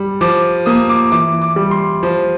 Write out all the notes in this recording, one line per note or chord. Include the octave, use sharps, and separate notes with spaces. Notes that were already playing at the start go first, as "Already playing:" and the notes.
Already playing: G3
F3 D6
A#3 D#6
D6
E3 D6
D6
G3
C6
F3